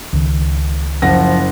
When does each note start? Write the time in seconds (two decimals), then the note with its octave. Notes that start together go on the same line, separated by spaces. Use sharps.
0.13 C#2 D#3
1.02 F#1 F3 F#5 A#6